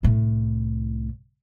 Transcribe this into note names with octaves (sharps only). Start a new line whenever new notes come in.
C2 A2